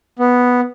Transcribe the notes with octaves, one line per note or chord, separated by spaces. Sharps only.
B3